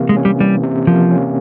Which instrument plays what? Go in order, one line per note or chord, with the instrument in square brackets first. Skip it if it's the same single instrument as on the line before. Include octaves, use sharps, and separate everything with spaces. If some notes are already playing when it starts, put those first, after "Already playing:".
Already playing: [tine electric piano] C3 E3 A#3
[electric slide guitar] G#3
[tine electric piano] C#4
[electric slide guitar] G3
[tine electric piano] E3 [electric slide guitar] G3
[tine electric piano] C3
[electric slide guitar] F3 [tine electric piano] A#3
[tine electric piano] C#4